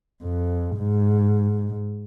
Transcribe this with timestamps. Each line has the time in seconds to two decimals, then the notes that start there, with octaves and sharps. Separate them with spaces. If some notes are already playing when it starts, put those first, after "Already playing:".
0.23 F2
0.77 G#2